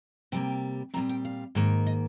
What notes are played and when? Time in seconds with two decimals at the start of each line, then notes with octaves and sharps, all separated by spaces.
0.32 C3 G3 A#3 G5
0.94 A#2 G3 C4 A#5
1.09 G5
1.25 F5
1.55 G#2 D#3 A#3
1.86 D#5